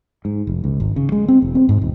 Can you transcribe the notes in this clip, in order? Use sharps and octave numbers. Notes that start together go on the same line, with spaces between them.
G#2
F1
C#2
G#1
C#3
G#3
C4
E1
C4
G#2
D#1